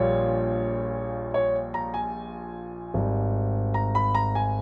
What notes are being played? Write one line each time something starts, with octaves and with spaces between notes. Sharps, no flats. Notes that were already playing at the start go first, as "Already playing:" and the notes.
Already playing: A#1 A#2 G3 C#5
C#5
A#5
G#5
G#1 G#2 G3
A#5
B5
A#5
G#5